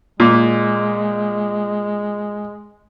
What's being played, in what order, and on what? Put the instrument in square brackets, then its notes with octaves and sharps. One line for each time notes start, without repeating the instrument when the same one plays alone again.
[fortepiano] A#2 [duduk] G#3